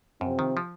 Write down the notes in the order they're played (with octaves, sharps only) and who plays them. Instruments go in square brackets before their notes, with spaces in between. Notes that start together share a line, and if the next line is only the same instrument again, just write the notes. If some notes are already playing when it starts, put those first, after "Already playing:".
[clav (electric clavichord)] F#2 [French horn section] C3 F3 C4
[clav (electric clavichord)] D#3
F3